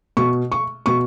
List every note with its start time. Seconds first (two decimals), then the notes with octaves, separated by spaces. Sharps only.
0.17 B2 C#6
0.52 C#6
0.86 B2 C#6